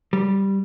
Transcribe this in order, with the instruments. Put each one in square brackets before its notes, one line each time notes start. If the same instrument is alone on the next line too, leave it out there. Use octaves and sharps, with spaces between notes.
[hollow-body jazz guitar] G3